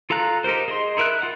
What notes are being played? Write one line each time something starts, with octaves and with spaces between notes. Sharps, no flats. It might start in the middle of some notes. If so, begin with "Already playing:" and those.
F4 A4 F5 A#5 F#6
D#4 G4 A#4 C5
G#4 D#5 C6
D#4 E4 A#4 E5 F#6
F4 F#5